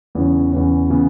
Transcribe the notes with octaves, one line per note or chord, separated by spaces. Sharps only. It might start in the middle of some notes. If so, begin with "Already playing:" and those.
E2 C#3 E3 C#4
E2 C#3 E3 C#4
C#3 E3 B3